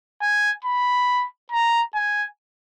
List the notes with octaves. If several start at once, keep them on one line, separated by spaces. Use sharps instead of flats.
G#5
B5
A#5
G#5